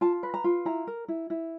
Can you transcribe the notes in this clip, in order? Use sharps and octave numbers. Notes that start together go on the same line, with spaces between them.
F4 A5
B4
A#5
F4
E4 A#5
A#4
E4
E4